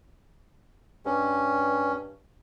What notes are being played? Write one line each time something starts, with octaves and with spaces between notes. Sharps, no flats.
G2 C#4